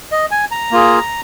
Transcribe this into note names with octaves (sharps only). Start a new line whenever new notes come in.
D#5
G#5
A#5
A#3 F4 G#4